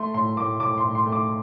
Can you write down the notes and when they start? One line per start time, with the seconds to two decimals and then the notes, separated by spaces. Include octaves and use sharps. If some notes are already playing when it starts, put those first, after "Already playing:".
Already playing: A3 C6
0.14 A2 C6
0.37 A2 D6
0.60 A2 D6
0.78 C6
0.84 A2
0.95 C6
1.06 A3
1.12 D6